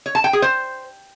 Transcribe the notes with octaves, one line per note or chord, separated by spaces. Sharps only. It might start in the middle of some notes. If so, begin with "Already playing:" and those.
C#5
A5
G5
G#4
C5